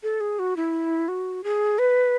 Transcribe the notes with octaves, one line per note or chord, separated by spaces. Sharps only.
A4
G#4
F#4
E4
F#4
G#4
B4